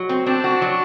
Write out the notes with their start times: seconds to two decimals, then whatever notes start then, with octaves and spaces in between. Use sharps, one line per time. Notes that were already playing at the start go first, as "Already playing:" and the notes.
Already playing: F#3
0.09 C4
0.26 C4 D4
0.44 F#4
0.62 F#3